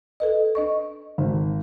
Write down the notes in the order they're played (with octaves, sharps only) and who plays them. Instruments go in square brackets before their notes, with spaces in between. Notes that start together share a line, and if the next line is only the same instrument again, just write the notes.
[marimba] A4 B4 D#5
D4 D#5 C#6
[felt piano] G#1